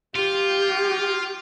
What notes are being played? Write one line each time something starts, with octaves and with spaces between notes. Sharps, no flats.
F4 G4